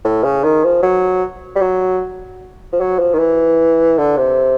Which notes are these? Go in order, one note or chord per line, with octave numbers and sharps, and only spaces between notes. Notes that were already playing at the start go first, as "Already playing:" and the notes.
A2
C#3
D#3
F3
F#3
G3
F#3
F3
F#3
F3
D#3
E3
D3
C3